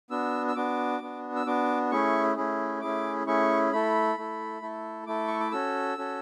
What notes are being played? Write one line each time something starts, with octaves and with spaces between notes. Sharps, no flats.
B3 D4 F#4 E6
E6
B3 D4 F#4 D6
B3 D4 F#4
E6
B3 D4 F#4 D6
A3 C#4 E4 G#4 C#6
A3 C#4 E4 G#4
A3 C#4 E4 G#4 D6
A3 C#4 E4 G#4 C#6
A3 E4 A4 B5
A3 E4 A4
A3 E4 A4
A3 E4 A4 D6
C#6
D6
C#4 F#4 A4 E6
C#4 F#4 A4